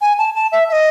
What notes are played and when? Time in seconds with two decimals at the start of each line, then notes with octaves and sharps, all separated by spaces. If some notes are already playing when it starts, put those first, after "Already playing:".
0.01 G#5
0.18 A5
0.35 A5
0.52 E5
0.69 E5
0.73 D#5